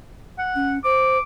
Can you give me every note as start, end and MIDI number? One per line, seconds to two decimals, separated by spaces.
0.39 0.73 78
0.55 0.79 61
0.84 1.18 72
0.84 1.22 86